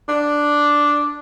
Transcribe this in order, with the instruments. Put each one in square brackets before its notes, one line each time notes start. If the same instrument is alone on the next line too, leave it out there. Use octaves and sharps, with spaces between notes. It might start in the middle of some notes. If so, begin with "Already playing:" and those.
[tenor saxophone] D4